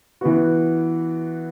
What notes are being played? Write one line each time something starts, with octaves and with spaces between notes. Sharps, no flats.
E3 B3 F#4